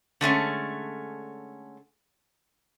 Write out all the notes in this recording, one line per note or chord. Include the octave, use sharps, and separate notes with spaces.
D3 G#3 A3 C#4